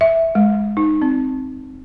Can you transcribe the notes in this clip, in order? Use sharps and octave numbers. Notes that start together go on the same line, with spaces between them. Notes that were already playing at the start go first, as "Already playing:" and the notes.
E5
G#3
D#4
C4